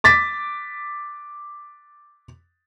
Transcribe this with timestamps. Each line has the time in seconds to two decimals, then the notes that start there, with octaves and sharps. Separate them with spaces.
0.04 D6 A6 B6